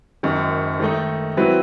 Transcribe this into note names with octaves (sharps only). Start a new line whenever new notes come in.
F#1 F#2 D#3
D#3 A3 D#4
F#3 C4 E4 B4